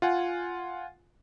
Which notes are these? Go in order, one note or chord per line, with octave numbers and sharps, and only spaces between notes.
F4 F#5 G#5